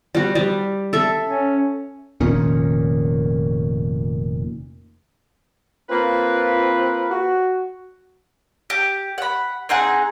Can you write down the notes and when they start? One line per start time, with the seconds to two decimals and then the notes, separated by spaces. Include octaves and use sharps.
0.15 G3 F#4
0.35 G3
0.93 A4 E5
1.23 C#4
2.20 F1 A#2 D#3 C#4
5.89 A#3 C4 F4 B4
7.11 F#4
8.70 G4
9.18 F#5 B5
9.69 C4 D#4 G#4 F#5